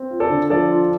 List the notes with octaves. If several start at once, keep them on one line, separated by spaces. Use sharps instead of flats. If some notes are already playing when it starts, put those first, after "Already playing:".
Already playing: C4
F4
A4 D5
D3
F3 A4 D5
F4